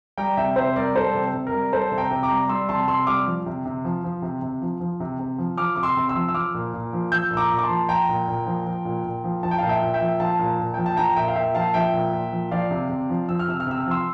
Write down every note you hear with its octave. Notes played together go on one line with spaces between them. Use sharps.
G3 G5 A#5
C3 E5 G5
C3 C5 E5
G3 A#4 D5
G3 A4 C5
C3
C3
A#4
G3
G3 A4 C5
C3
G5 A#5
C3
A#5 D6
G3
G3 C6 E6
C3 A5 C6
C3 C6 E6
G3 D6 F6
F3
C3
C3
F3
F3
C3
C3
F3
F3
C3
C3
F3
F3 D6 F6
C3 D6
C6 E6
C3
C6 E6
F3
E6
F3 D6 F6
A#2
A#2
F3
F3 E6 G6
A#2 E6
A#5 D6
A#2
D6
A5 C6
F3
F3 G5 A#5
A#2
A#2
F3
F3
A#2
A#2
F3
F3 A5
G5
A#2 F5 A5
E5 G5
A#2
E5 G5
F3
F3 F5 A5
A#2
A#2
F3 G5
A5
F3 G5 A#5
A#2 E5 G5
F5
A#2 E5 G5
F3 F5 A5
F3 E5 G5
A#2
A#2
F3
F3 D5 F5
C3
C3
F3
F3 E6
F6
C3 E6
F6
C3 E6
F6
F3 C6 E6